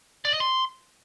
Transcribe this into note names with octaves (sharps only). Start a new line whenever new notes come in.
D5
D#5
C6